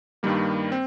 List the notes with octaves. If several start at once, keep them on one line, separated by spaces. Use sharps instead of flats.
G2 D#3 G3 A#3
C4